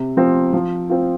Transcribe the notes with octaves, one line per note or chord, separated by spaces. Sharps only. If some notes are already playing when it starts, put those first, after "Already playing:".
Already playing: C3
F3 C4
F3
C4 F4